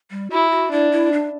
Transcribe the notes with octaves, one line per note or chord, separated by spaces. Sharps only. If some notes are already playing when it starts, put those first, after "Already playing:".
G3
E4 F#4
F#4
D4 E4
E4
D4